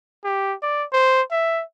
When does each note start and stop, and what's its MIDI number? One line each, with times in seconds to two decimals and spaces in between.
0.25 0.55 67
0.63 0.85 74
0.93 1.22 72
1.31 1.63 76